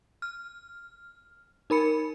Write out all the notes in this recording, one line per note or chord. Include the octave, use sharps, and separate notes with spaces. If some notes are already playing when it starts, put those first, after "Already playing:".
F6
D#4 A#4 B5 C#7